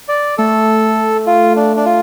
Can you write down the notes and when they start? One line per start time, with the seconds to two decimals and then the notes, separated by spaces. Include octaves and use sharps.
0.08 D5
0.38 A3 A4
1.27 F4
1.56 D4
1.76 D4
1.85 F4